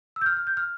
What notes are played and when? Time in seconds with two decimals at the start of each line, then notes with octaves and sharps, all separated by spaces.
0.16 E6
0.22 G6
0.26 F6
0.37 F6
0.47 G6
0.57 F6